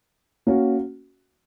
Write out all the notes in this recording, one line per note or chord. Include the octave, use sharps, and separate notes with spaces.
A#3 C#4 F#4